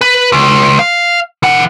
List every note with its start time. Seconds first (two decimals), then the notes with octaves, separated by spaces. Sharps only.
0.01 B4
0.32 C#2
0.79 F5
1.43 E3 F#5